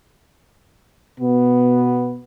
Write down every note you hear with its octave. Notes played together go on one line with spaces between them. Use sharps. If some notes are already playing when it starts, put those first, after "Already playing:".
B2 B3